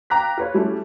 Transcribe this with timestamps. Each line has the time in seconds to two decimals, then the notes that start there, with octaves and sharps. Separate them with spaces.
0.10 F5 G5 A#5 D6 F#6 B6
0.37 F4 B4 C#5
0.54 G3 A3 C#4 E4